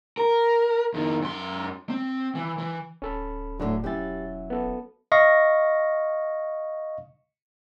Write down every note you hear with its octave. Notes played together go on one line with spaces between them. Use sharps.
A#4
F2 D#3
F#2 C6
C4
E3
E3
D1 C#4 A4 B5
A2 D3 F#3 D4
E1 F#3 C#4 E4 G4 A6
B3 A4
D#5 F5 C#6 A#6